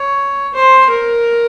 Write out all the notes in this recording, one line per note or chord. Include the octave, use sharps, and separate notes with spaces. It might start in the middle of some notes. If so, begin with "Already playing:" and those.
Already playing: C#5
C5
A#4